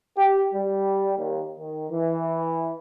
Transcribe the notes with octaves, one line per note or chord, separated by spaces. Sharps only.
G4
G3
D#2
D#3
E3